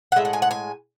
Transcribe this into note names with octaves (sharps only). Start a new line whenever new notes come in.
F#5
A2 G#3 E5
F#5
G#5
F#5
G#5